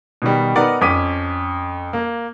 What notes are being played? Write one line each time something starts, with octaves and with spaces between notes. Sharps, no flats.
B2 D#3 G3
B3 D#4 A#4 D5 F#5
F2 C#4 D6 B6 D#7
A#3